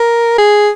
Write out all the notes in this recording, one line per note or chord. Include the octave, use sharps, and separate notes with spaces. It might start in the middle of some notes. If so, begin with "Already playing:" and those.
Already playing: A#4
G#4